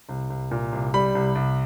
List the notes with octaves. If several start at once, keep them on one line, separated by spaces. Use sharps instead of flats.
C2
C2
A#2
C2
G3 B5
C2
C2